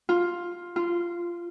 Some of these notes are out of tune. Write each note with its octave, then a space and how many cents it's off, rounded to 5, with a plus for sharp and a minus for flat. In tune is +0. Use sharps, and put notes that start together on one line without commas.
F4 +5
F4 -15